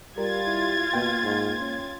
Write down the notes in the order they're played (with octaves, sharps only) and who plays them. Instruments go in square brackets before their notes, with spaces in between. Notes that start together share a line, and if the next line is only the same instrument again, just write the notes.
[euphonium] G3 [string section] F4 G#6 A6 [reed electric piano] A#4
[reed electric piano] E4
[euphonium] B2 [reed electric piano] A#3 G5
[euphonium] G#2
C#4